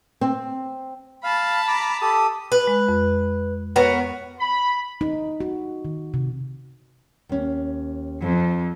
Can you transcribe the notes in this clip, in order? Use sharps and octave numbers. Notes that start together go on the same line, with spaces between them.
C4
F5 A5 B5
A#5 D6
G4 A4 D#6
B4
G#3
F2
B3 F#4 A#4 C#5
B5
D#4
F#4
D#3
C3
D#2 C#4
F2 F3